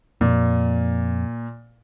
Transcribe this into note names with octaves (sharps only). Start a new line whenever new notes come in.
F2 A#2